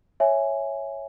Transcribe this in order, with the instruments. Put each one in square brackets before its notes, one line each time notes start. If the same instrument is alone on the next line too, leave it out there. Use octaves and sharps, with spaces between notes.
[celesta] C#5 E5 G#5